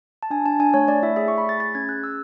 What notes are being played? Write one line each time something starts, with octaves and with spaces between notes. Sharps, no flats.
A5
D4 G#5
D4 A5
D4 G#5
A3 C#5
A3 D5
E4 E5
G#4 E5
C#6
A3
B5
G#4 A6
G#4 A6
C#4 G#6
G#4 F#6
C#4 E6